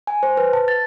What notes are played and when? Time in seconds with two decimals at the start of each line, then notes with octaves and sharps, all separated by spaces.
0.07 G#5
0.23 C5
0.37 B4
0.53 A5
0.68 A6